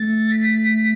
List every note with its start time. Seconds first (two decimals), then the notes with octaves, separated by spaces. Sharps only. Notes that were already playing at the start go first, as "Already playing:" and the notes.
Already playing: A3 A6
0.31 B6